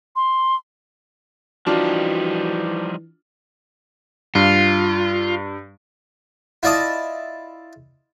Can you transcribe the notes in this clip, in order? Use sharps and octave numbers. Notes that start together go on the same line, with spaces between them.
C6
E3 F3 G3 D4 D#4 F4 F#4
G2 F4
E4 F4 D5 D#5 A5